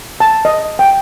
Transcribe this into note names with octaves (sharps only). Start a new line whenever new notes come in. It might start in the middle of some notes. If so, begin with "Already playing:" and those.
A5
D#5
G5